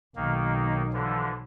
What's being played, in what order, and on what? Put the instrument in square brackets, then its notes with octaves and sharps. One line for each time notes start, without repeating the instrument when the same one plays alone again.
[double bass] B1 [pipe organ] D#3 A#3
[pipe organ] D3 E3 F3